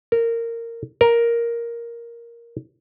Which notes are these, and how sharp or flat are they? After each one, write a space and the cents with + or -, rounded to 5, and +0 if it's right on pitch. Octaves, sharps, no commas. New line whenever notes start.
A#4 -15
A#4 +5